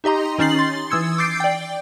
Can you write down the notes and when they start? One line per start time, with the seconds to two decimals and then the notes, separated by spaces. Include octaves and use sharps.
0.04 D#4 G4 D#5 A#5 C6
0.38 D#3 C#4 D#4 A6 C7 F#7
0.59 C6 A6
0.90 E3 D#6 E6 G#6 C#7
1.18 D6 G6 A6 C7 D7
1.40 D5 G5